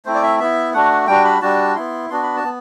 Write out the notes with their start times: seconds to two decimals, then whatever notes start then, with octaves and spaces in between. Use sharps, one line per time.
0.06 A3 C4 E4 C5
0.15 D5
0.23 E5
0.40 B3 E4 E5
0.74 A3 D4 F#4 F#5
1.08 G3 D4 F#4 G5
1.25 B5
1.42 G3 D4 F#4 A5
1.76 B3 E4 C6
2.10 B3 D4 F#4 C6
2.23 B5
2.36 A5
2.44 B3